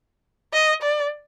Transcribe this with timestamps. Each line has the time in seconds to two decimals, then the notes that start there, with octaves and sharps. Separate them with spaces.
0.53 D#5
0.82 D5